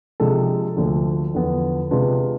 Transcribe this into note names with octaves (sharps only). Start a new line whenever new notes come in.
C3 F3 G#3 D4 A4
D2 D3 F3
E2 D3 F3 B3
C3 G#3 D4 F4 B4